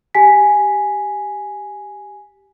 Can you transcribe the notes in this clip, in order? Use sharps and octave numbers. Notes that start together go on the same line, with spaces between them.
G4 G#5 B6